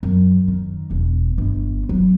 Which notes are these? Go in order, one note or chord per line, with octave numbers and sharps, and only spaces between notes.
F#2
D#3
E1
G1
F#3